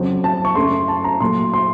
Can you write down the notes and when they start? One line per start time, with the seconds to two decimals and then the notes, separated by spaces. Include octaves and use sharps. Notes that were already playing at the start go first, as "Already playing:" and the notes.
Already playing: F2 C#3 F#3 C4
0.24 A5
0.45 C#6
0.55 F#2 C#3 A3 C6
0.88 A5
1.04 A#5
1.20 A#2 F#3 A3 C6
1.54 C6